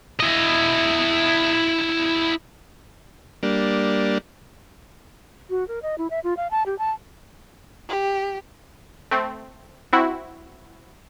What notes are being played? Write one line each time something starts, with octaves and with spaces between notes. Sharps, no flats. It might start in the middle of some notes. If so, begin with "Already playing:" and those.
E4 D#5
G3 A#3 D4
F#4
A#4
D#5
E4
E5
F4
F5
A5
G4
A5
G4
A3 C4
C4 E4 F#4